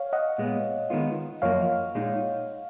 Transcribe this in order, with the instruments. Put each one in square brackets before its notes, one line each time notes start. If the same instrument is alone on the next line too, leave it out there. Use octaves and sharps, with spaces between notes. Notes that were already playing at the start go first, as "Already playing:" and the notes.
Already playing: [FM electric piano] C#5 F5
D#5 F#5
[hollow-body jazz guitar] A#2 G#3 B3
D#3 G#3 B3 F4
[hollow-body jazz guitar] F#2 F3 A#3 [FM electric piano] C#5 F5
[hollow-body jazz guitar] A#2 G#3 D#4